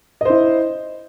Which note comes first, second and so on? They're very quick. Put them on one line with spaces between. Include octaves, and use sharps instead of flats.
D#5 C5 E4